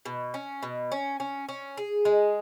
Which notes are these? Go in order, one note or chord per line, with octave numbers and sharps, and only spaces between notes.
B2
C#4
B2
C#4
C#4
C#4
G#4
G#3